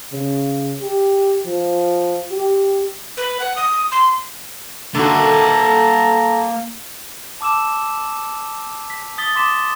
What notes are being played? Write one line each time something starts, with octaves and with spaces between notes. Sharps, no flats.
C#3
G4
F3
G4
B4
F#5
D#6
C6
D3 A#3 F#4 A4 E5 A#5
A5 D6 E6 E7
B6
D#6 A6 B6 G7
C6 D6 D#6 B6 E7